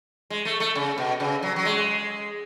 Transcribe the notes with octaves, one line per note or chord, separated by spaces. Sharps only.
G#3
A3
A3
C#3
B2
C#3
F#3
F#3
G#3